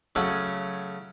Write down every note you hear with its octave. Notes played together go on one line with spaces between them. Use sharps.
C#3 F#3 A3 C#4 F#4